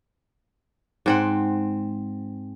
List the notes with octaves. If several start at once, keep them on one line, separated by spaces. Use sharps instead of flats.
G#2 C4 F#5